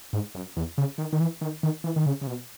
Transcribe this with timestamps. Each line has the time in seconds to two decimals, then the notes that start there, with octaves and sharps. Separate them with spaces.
0.13 G#2
0.35 F#2
0.56 E2
0.78 C#3
0.98 D#3
1.13 D#3
1.20 E3
1.41 D#3
1.63 D#3
1.84 E3
1.96 D#3
2.06 C#3
2.21 C#3
2.27 B2